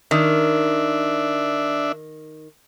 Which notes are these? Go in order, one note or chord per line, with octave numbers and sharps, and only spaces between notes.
D#3 D4 E5